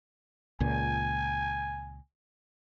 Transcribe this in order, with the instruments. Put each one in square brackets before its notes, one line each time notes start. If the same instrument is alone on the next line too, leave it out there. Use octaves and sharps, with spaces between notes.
[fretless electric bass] C#2 A#2 [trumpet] G#5